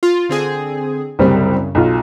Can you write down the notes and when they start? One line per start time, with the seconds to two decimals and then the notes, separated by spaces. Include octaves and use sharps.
0.03 F4
0.29 D3 C4 G#4
1.19 C2 F#2 C#3 G3 C4
1.75 B1 F4